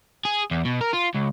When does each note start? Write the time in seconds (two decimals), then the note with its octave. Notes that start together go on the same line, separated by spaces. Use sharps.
0.25 G#4
0.51 E2
0.65 B2
0.81 A#4
0.94 F4
1.15 C#2